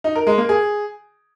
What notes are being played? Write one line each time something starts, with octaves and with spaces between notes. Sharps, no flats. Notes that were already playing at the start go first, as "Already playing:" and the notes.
D#4
A#4
G#3
A#3
G#4